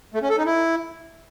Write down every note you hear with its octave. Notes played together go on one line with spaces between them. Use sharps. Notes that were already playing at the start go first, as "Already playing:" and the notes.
A3
C#4
A4
D#4
E4